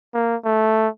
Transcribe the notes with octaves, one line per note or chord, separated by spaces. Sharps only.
A#3
A3